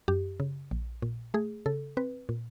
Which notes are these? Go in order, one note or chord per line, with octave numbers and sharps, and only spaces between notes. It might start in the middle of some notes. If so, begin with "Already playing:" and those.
F#2 G4
C#3
A#1
A#2
A3 G#4
C#3 A4
C4 B4
A#2